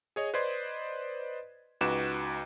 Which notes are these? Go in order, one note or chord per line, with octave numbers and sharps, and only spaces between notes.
G#4 C#5 D#5
B4 C5 D5 D#5 C6 G#6
C#2 D#4 F#4 B4 D6 E7